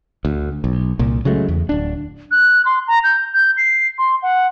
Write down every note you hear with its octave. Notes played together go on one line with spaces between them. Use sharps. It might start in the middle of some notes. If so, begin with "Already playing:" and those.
D2
B1
C2 A#2
C#3 F#3 G#3 A3
E2
D1 D4
F#6
C6
A#5
G6
G6
C7
C6
F#5